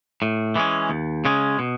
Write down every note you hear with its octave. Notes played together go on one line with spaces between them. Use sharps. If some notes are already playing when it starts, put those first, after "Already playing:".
A2
E3 G#3 C#4
D#2
C#3 G#3 C#4
B2